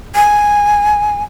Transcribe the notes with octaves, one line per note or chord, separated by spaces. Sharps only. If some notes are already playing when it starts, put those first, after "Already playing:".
G#5